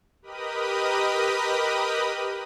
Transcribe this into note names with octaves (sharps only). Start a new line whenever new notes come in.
G4 A#4 B4 D#5 B5 D#6